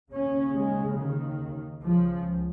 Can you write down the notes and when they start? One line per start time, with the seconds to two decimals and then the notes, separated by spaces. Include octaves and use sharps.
0.13 D#2 C#3 C#4
0.56 G#3
0.98 D#3
1.84 C#2 C#3 F3